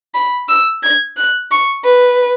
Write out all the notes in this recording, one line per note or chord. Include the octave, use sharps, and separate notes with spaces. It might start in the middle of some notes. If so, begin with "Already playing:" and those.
B5
E6
G#6
F#6
C#6
B4